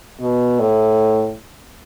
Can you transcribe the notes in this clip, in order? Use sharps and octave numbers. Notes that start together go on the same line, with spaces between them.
B2
A2